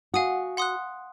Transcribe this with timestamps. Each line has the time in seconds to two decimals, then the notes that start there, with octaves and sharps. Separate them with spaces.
0.14 F#4 F5 G#5 D#6
0.57 F#5 C6 D#6 F#6